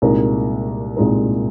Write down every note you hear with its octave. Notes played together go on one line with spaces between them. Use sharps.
C2 A#2 G#3 D#4 A#4
C2 A#2 G#3 D#4 A#4